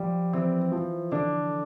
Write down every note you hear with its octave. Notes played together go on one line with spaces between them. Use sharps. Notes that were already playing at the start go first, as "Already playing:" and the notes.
Already playing: F3 G3
E3 C4
F3
D3 D4